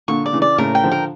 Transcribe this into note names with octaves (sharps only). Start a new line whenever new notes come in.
A#2 D3 C#6
D5
C#3 E3
D5
A2 C#3 A#4
G5
D3 F3
A#4